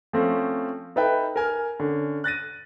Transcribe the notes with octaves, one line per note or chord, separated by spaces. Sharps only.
F3 A3 C4 C#4
D#4 A4 B4 E5 G5
A#4 G#5 F6
D3 C#4
F#6 A6 A#6 D#7